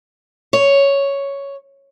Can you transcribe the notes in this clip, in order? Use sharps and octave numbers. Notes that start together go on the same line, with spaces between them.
C#5